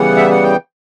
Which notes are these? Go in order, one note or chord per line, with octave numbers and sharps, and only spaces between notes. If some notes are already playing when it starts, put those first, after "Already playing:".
Already playing: C#3 E3 G3 B3 F#5
E5
F#5
G5